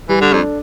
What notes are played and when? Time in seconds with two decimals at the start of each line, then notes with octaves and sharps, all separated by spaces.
0.09 E3 G3
0.21 D3
0.32 F2 D4 A4